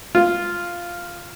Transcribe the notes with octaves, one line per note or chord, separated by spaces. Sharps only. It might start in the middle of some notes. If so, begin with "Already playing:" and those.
F4